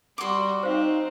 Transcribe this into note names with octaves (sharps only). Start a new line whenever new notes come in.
G3 F#4 C6 D6
C4 D#4 C5 F5